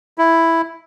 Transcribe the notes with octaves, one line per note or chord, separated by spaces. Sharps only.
E4